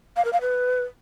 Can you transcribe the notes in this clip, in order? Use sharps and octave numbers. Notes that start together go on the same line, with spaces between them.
F5
A#4
F5
B4